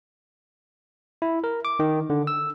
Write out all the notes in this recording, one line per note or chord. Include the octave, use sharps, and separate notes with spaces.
E4
A#4
D6
D#3
D3
E6